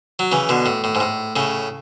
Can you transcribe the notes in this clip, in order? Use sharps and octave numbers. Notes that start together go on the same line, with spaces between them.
F#3
C#3 E3
B2 D3
A2
A2
G#2
A2
A2 C#3